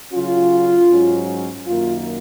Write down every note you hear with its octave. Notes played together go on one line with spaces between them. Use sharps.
C#3 F#3 C#4 F4
G#2 F#3 C#4
F#2 D#3 A#3 F4